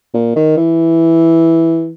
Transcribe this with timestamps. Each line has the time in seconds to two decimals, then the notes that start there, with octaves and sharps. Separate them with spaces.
0.14 A#2
0.36 D#3
0.57 E3